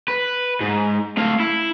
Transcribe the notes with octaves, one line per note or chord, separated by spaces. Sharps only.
B4
G#2
A3 F5
E4